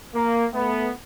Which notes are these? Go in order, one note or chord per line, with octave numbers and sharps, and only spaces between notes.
A#3
A3 B3